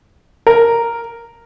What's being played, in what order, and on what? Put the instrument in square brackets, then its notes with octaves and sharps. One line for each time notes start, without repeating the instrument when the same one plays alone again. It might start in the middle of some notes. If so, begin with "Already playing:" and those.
[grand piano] A#4